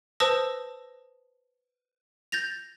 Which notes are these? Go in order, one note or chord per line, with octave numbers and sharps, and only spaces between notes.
B4 C5 A5 D#6 E6 A#6
G6 A6 A#6 F7